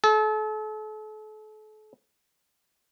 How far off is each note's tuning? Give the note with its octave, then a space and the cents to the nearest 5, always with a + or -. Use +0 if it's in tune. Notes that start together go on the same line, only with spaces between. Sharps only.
A4 -40